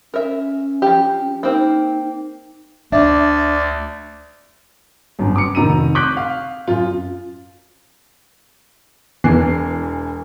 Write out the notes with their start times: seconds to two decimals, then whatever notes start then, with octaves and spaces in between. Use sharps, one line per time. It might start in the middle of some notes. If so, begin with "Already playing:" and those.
0.14 C#4 A#4 E5
0.82 F3 G4
1.43 A#3 C4 D#4
2.92 D2 D4 D5 E5
5.19 G1 F#2
5.36 D6 C#7
5.55 F1 D#3 A#5 E6 D#7
5.95 C#6 D6 F#6 G6 B6
6.17 F5
6.68 F#2 F4
9.24 E1 E2 E3 C7